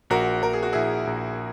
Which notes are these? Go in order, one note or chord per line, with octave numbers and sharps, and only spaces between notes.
A#1 F#4 A#4
A#1 A#4
G#4
F#4
A#1 E4 G#4
A#1